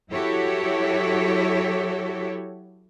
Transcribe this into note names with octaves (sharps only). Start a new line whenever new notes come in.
F#3 E4 F#4 G4 A4 C#5